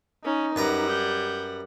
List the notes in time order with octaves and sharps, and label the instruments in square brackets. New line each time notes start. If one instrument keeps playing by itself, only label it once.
[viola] C#4 [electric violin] D#4
[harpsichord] F#2 B4 A#5 [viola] G3 F#5
[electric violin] G6